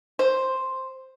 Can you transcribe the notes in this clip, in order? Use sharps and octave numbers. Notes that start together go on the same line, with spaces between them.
C5